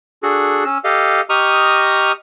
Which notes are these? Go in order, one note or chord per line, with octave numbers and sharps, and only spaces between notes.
D4 F#4 G#4 A4
C#4 E6
G4 A4 D#5 F5
G4 D#5 A#5 C#6 D#6 F6